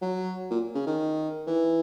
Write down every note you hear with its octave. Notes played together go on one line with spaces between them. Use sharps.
F#3
A#2
C#3
D#3
E3